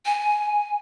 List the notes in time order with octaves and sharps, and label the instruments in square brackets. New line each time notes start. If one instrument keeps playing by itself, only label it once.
[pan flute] G#5